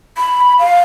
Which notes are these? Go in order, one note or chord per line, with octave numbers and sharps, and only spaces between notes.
B5
F5